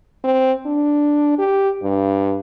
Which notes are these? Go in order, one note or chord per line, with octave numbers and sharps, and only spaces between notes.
C4
D4
G4
G2